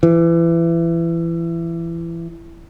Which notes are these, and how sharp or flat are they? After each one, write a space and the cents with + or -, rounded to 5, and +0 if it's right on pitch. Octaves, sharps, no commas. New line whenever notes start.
E3 +25